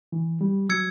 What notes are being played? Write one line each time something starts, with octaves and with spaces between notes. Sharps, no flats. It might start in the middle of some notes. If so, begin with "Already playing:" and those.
E3
G3
F#3 E6 G#6 C#7